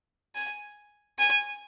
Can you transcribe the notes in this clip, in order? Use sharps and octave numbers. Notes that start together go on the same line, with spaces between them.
G#5
G#5